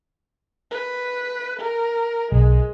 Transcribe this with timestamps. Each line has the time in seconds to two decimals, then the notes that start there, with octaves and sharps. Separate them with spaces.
0.71 B4
1.60 A#4
2.32 B1 G#3